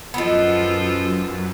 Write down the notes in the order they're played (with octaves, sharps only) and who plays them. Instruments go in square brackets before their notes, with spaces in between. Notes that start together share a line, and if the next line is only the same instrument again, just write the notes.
[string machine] F#2 [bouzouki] D#3 B3 [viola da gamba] F3 F4 A4